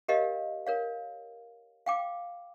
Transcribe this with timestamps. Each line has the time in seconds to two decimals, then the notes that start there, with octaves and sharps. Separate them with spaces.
0.08 G4 A#4 C#5 D#5 F5
0.67 A#4 C#5 F5
1.86 F5 G5 D6